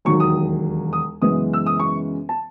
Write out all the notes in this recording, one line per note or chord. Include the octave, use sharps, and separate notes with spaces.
E1 D#2 D#3 F#3 C#6
D#6
D#6
F#2 C#3 E3 G#3 B3 D#6
E6
D#6
C#6
A5